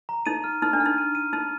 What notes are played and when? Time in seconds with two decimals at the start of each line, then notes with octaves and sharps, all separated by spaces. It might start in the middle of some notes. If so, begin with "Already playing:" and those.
0.09 A#5
0.26 D#4 D#7
0.44 F6
0.62 D#4 F6
0.73 D4
0.80 F6
0.86 D#4
0.98 D#7
1.15 D#7
1.33 D#4 D#7